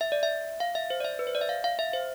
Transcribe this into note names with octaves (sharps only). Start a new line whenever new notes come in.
E5
D5
E5
F5
E5
C5
D5
E5
B4
C5
D5
E5
F5
F5
E5
C5